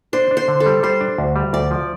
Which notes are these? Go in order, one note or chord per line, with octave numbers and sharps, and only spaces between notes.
D4 C5
D4
C5
D3
A4
G3
G3 C5
D4
D2
G3
D2 D5
F3